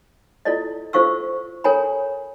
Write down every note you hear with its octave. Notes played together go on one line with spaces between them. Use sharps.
E4 F4 A4 D5 D#5
F4 A4 C5 F5 C#6 E6
A4 A#4 C#5 G#5 A#5 B5